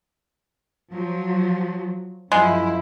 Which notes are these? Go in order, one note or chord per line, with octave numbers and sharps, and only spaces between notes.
F3 F#3
F#2 F3 G#3 E4